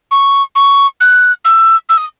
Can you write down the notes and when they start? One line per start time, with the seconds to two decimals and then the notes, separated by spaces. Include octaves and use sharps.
0.11 C#6
0.55 C#6
1.00 F#6
1.45 E6
1.89 E6
1.97 D#6